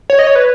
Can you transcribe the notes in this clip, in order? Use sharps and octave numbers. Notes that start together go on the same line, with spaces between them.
C#5
D#5
C#5
B4